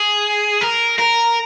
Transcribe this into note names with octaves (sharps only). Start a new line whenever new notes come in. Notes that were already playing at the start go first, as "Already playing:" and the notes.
Already playing: G#4
A#4
A#4